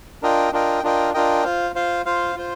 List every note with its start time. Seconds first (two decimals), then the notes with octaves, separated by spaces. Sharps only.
0.23 D4 F4 A#4 D#5 G5
0.53 D4 F4 A#4 D#5 G5
0.83 D4 F4 A#4 D#5 G5
1.14 D4 F4 A#4 D#5 G5
1.44 F4 C5 F5
1.75 F4 C5 F5
2.06 F4 C5 F5
2.36 F4 C5